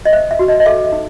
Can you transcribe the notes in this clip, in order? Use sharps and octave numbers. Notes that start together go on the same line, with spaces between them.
D#5
C5 E5
E5
F#4
D#5
D#5
A4 E5
D#4